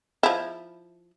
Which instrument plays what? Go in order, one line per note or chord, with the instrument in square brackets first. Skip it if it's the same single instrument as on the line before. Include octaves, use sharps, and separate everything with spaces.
[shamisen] F3 E4